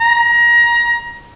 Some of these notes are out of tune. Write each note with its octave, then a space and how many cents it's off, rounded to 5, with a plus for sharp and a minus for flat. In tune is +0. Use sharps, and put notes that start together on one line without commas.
A#5 +25